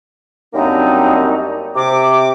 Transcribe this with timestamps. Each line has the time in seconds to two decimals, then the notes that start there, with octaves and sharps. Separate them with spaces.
0.54 F#2 G3 A#3 C4 D4 D#4
1.76 C3 D6